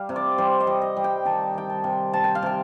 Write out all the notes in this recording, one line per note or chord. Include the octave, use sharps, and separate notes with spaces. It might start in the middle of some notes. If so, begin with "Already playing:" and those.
Already playing: G3 F5
C3
D5
G3 C5
D#5
G3
D#5
G3
G5
D#3 A5
D#3 G5
A5
C3
C3 A5
G5
F5
C3 G5